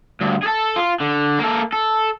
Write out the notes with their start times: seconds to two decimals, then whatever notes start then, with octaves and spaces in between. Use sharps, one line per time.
0.21 D2 G2
0.42 G#4 A4
0.76 F4
1.01 D3
1.39 A#3 A4
1.73 A4